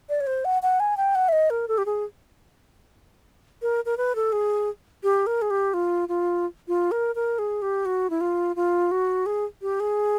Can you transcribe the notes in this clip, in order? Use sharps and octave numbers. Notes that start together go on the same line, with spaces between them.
D5
C#5
C5
F#5
F#5
G#5
G5
F#5
E5
D#5
A#4
A4
G4
G#4
A#4
A#4
B4
A4
G#4
G4
A#4
G#4
G4
F4
F4
F4
A#4
A#4
G#4
G4
F#4
E4
F4
F4
F#4
G#4
G4
G#4